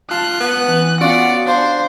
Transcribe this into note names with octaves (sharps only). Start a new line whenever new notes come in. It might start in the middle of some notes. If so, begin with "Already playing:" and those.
F4 A5 F#6
B3
E3
B3 C#4 F4 F#4 D5 F5 F#5
D4 C5 F5